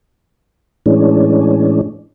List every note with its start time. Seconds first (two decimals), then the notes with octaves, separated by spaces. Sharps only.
0.86 A2 E3 G#3 C#4 D4